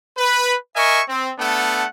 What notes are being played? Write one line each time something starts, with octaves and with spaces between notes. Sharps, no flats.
B4
A#4 D#5 E5 G#5 C#6
C4
A3 B3 D4 A4 F#5